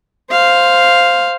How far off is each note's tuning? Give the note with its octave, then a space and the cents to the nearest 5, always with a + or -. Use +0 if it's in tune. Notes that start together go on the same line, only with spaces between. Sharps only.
C5 +0 F5 +0